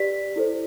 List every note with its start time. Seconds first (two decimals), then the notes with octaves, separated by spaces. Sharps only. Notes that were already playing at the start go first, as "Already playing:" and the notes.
Already playing: G4 B4 D5 B6
0.36 E4 A4 C5